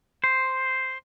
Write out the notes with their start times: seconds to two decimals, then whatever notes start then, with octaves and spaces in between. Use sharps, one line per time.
0.24 C5